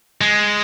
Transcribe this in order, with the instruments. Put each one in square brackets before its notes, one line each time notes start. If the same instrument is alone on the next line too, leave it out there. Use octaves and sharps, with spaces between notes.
[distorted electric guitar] G#3